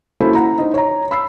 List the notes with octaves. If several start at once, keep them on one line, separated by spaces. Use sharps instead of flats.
A#3 C#4 E4 F#4 A4 C5
F#5 A#5
D#4 C5
C#5 A#5
B5 E6 C7